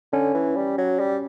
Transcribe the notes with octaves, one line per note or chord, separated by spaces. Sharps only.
D3 C#4
E3
G3
F#3
G3